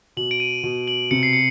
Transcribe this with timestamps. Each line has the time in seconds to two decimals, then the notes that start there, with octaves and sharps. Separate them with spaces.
0.17 B2 F#7
0.31 D7
0.40 D#7
0.63 B2
0.88 F#7
1.11 C3 C#7
1.23 C7
1.33 C#7